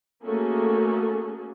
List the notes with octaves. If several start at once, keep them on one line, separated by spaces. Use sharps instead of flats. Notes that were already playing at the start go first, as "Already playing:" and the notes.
A3 A#3 C#4 F#4 G#4 A4